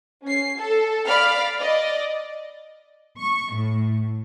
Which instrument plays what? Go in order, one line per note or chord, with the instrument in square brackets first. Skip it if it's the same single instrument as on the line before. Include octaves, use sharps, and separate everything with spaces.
[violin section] C#4 C7
A4
D5 F5 B5 F6
D5 D#5
[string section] C#6
A2